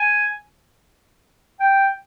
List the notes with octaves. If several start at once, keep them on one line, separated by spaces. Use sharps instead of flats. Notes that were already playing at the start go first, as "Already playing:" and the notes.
Already playing: G#5
G5